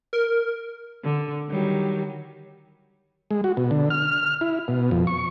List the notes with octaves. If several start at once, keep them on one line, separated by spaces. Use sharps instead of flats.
A#4
D3
D#3 F#3 G3
G#3
F#4
B2
D3
F6
E4
B2
F2
C#6